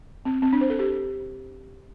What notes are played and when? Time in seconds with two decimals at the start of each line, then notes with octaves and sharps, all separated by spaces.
0.25 C4
0.42 C4
0.53 D4
0.61 C5
0.70 A4
0.79 G4